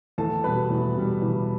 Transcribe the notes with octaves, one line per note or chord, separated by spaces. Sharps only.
E2 A4 A5
B2 G3 B4 B5
E2
B2 G3
E2